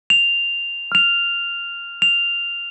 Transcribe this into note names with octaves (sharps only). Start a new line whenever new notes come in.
F7
F6 F7
F7